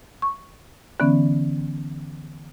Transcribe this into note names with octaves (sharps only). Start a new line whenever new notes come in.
C#6
D3 E3 B3 C#4